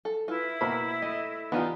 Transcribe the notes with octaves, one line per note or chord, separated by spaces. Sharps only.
A4
E4 F4 B4
B2 A#3 C5 B5
A3 D#5
E3 B3 D4 D#4 F4 G4